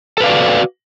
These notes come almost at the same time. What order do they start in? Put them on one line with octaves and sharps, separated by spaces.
A4 B4 F5 D5 F#4